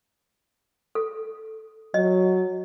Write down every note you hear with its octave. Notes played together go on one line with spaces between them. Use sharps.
A4
F#3 D#5